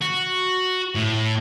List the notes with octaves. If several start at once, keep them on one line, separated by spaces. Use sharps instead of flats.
F#4
A2